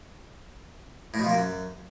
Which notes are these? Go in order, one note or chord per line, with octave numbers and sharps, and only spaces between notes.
A2
B2
F3
A#3
F#2